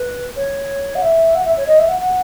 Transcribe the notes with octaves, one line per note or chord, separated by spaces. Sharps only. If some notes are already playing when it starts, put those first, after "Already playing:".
Already playing: B4
C#5
F#5
E5
F#5
E5
C#5
D#5
E5
F#5
F#5